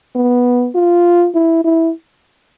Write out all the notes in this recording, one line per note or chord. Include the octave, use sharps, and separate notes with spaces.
B3
F4
E4
E4